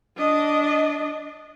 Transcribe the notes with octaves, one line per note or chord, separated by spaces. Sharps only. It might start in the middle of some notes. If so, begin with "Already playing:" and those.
D4 D#5